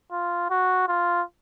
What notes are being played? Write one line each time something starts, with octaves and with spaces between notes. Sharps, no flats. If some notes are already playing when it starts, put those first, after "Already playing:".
F4
F#4
F4